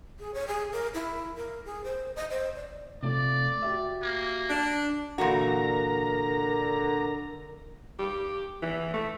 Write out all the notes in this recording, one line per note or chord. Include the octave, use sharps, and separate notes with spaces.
G#4
C#5
G#4
A#4
E4
A#4
G#4
C5
D#5
C5
D5
C3 A3 F4 D5
F#4 G4 E5
A#3
D4
A#2 D3 E3 F#4 A#4 A#5
G4
E3
A3